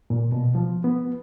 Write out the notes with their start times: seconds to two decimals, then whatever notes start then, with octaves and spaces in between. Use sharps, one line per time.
0.10 A#2
0.32 B2
0.55 F3
0.84 B3